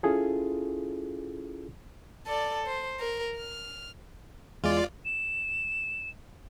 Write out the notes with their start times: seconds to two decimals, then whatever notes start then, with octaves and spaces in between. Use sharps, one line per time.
0.03 C#4 E4 F4 G#4 A4
2.27 A4 D5
2.67 C5
3.00 A#4
3.36 F6
4.64 E2 G#3 F4 D5
5.05 E7